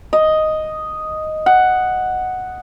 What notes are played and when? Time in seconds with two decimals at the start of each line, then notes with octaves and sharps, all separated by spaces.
0.13 D#5
1.46 F#5